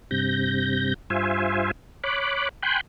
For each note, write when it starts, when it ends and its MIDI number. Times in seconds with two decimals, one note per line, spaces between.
0.11 0.94 43
0.11 0.94 48
0.11 0.94 91
0.11 0.94 94
1.10 1.71 43
1.10 1.71 65
1.10 1.71 72
1.10 1.71 76
1.10 1.71 80
2.04 2.49 73
2.04 2.49 83
2.04 2.49 86
2.04 2.49 90
2.63 2.81 79
2.63 2.81 80
2.63 2.81 83
2.63 2.81 84
2.63 2.81 90
2.63 2.81 91